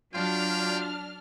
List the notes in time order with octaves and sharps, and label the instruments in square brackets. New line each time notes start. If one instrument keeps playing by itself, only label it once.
[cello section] F#3 [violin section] D4 F6 [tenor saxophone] F4 [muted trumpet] G5